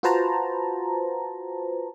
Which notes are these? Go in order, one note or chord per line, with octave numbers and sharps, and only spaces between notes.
F4 F#4 B4 C5 A5 A#5